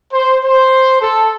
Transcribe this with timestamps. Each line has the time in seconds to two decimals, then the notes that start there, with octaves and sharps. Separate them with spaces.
0.13 C5
0.44 C5
1.01 A4